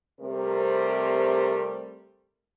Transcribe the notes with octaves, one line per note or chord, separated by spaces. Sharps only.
C3 G3 A3 C4 A#4